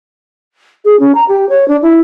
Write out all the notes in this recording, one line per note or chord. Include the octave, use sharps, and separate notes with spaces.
G#4
C#4
A#5
G4
C#5
D4
E4